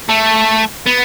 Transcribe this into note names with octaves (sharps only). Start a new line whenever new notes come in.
A3
B3